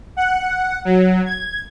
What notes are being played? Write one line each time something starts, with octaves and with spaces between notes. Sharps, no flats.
F#5
F#3
G#6